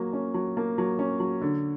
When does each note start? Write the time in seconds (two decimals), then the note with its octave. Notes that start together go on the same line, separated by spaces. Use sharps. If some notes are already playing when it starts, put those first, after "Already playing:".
Already playing: F#3 A#3
0.13 C#4
0.34 F#3
0.57 A#3
0.78 F#3
0.99 C#4
1.20 F#3
1.42 D3